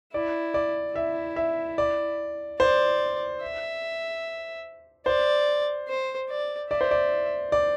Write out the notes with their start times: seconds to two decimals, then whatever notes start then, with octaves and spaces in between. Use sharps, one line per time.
0.13 E4 D5
0.54 D5
0.95 E4 E5
1.36 E5
1.78 D5
2.60 C5 D5
3.43 E5
5.06 C5 D5
5.88 C5
6.29 D5
6.71 D5 E5
6.81 C5
6.91 D5
7.52 D5